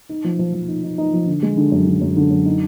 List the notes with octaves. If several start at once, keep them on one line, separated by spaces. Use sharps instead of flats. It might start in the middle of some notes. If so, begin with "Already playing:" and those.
D#4
F3
F3
F3
D#4
D#4
D#4
F3
D3
G#3
D3
F#2
D3
F#2
D3
F#2
D#4